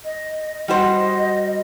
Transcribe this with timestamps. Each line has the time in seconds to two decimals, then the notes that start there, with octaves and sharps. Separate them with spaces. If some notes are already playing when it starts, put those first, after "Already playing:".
0.05 D#5
0.68 G3 F#4 C5 D#5